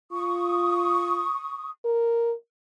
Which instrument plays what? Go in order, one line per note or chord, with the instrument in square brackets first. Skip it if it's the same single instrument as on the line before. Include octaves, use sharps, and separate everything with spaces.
[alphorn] F4 [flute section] C#6 D#6
[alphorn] A#4